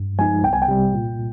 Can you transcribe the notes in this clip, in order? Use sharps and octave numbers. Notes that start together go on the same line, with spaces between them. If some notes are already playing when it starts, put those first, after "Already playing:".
Already playing: G2
F3 G#3 D#4 G#5
C2 G5
G#5
G5
C3 G3
A#2